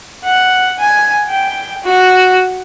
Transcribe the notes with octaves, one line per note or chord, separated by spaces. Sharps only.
F#5
G#5
G5
F#4